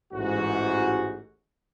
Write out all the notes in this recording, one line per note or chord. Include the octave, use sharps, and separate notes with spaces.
A1 G#2 F#4